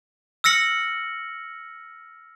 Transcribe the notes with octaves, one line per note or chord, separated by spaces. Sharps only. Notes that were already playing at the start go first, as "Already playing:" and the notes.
E6 F6 A#6 C#7 F#7